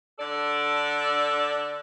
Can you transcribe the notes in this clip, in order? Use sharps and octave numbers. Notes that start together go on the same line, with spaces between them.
D3 A4 D5